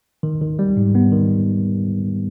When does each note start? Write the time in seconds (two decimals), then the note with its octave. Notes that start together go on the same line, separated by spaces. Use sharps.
0.23 D#3
0.41 D#3
0.59 G3
0.77 G#2
0.95 B3
1.12 D#3